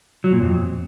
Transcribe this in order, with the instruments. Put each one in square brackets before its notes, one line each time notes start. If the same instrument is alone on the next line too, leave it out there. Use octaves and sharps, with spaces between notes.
[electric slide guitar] F#3
A#2
F2